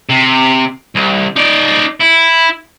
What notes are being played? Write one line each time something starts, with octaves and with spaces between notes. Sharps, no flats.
C3
C2
D#4 D5
E4